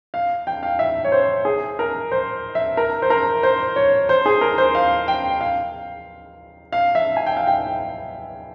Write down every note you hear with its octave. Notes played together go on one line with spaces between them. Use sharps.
F5
G5
F5
E5
C#5
C5
G#4
A#4
C5
E5
A#4
C5
A#4
C5
C#5
C5
G#4
A#4
C5
F5
G5
F5
F5
E5
G#5
G5
F5
G5